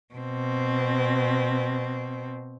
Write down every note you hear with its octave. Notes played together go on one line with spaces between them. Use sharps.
B2 C4